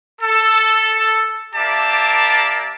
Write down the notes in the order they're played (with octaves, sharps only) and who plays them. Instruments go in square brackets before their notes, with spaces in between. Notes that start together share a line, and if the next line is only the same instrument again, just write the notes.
[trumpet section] A4
A#3 G4 D5 E5 A5